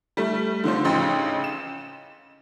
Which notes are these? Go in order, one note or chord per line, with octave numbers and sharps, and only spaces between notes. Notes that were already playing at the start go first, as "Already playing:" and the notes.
G3 A3
D3 F3 C4 C5
A1 C#3 D#4 C6
E7